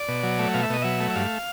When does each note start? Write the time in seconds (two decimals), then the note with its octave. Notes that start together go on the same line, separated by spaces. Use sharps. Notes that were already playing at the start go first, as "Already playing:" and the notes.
Already playing: D5
0.08 B2
0.23 F#3
0.39 A3
0.54 B2 F5
0.63 E5
0.70 B2 D#5
0.82 F#3 E5
1.00 A3
1.10 E5
1.15 G2 F5